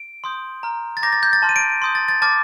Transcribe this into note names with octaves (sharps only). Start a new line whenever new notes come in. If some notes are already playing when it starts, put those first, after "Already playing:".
Already playing: D7
C6 D#6 G6
A#5 F6
A6
A#5 D6 G6 A#6
A6
G6
A6
A5 C6 F6
D#7
D7
C6 D#6 G6
A6
A6
A5 D6 F6 A6